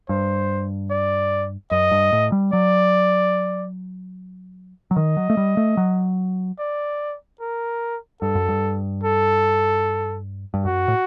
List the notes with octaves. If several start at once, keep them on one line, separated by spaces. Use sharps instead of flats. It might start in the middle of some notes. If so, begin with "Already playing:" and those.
G2 C5
D5
F#2 D#5
G2
A2
G3
F#3 D5
F#3
D#3 D#5
F#3
A3
G3
A3
F#3
D5
A#4
G2 A4
F#2
G2
A4
G2
F#2 F#4
A2